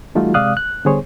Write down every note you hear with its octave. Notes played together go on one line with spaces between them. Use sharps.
E3 G3 A3 D#4 F4 F#4
C3 G#3 D5 F5 D#6 F#6
F#6
D3 G3 B3 G#4 C5 C#5